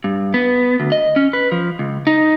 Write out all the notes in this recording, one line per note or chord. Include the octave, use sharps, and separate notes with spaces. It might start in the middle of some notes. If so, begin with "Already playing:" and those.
G2
B3
D2
D#5
C#4
B4
F3
C#2
D#4